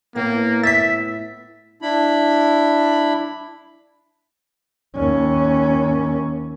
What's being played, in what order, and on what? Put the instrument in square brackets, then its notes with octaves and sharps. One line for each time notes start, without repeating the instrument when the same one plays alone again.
[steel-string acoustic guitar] A2 B3 [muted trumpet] A#3
[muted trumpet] E5 [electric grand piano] A6 B6
[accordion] D4 E4 B5
[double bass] D#2 C#4